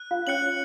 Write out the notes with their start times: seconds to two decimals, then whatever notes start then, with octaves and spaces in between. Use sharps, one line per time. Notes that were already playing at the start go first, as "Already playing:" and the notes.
Already playing: F#6
0.11 F4 F5
0.27 C#4 C#5 F#6 C#7 F#7